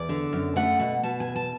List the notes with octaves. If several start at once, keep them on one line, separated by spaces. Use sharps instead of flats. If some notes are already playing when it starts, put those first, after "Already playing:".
Already playing: E2 D5
D3
F#2
A3 F#5
B2
B2 A5
G#5
E2
A5